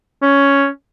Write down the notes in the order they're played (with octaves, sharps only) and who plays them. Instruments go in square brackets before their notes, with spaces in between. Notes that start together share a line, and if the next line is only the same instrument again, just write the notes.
[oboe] C#4